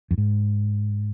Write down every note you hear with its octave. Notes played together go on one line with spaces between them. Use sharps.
F2
G#2